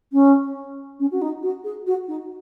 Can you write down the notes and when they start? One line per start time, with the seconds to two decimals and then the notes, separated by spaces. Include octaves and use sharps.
0.13 C#4
1.00 C#4
1.12 F#4
1.22 D#4
1.43 F#4
1.64 G#4
1.87 F#4
2.08 D#4